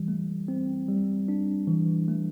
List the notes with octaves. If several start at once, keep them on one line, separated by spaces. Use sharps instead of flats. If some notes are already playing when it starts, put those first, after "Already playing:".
Already playing: E3 G3
A3
C4
G3
D4
E3
A3